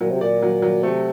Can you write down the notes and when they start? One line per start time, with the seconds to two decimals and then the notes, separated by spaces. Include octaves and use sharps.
0.01 A#2 F#3
0.11 C3
0.21 A#2 D5
0.43 F#3
0.62 F#3
0.83 C3 A3